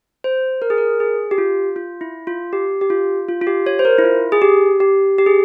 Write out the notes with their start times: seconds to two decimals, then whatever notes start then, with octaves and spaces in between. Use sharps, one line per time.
0.24 C5
0.62 A#4
0.70 G#4
0.78 A#4
1.00 G#4
1.31 G4
1.38 F4
1.76 F4
2.01 E4
2.27 F4
2.53 G4
2.81 G4
2.90 F4
3.28 F4
3.41 F4
3.47 G4
3.66 C#5
3.79 C5
3.85 A#4
3.98 E4
4.04 F4
4.32 G#4
4.42 G4
4.80 G4
5.18 G4
5.26 G#4